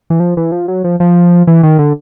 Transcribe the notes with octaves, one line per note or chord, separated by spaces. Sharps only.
E3
F3
E3
F3
F#3
F3
F3
E3
D#3
D3